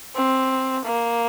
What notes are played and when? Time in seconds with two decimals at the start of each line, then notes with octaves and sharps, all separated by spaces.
0.15 C4
0.84 A#3